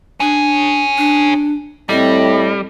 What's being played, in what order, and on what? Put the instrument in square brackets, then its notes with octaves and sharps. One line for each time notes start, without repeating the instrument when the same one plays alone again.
[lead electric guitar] C#4 G#4 [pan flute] D4
[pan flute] D4
[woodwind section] A2 C4 [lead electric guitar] G3 [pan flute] D#5